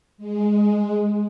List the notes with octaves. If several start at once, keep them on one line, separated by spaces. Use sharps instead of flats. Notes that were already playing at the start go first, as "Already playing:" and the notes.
G#3